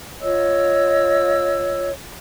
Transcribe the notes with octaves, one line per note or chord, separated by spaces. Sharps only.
F4 C#5 D#5 E6